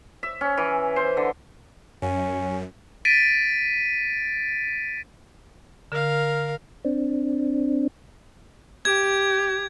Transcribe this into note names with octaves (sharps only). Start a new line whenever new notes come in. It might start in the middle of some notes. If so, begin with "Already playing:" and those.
E5
C#4
E3
C5
D3
F#2 C#4
A6 B6 D7 D#7
D3 A#4 F5
C4 D4
G4 G#6